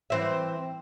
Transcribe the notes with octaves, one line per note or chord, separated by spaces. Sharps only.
E3 C4 E5